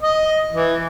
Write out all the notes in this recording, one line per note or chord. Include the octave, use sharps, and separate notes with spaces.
D#5
E3